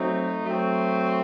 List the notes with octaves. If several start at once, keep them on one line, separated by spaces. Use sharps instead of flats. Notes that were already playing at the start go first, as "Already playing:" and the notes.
Already playing: F#3 A3 C4 D#4
F#3 A3 C4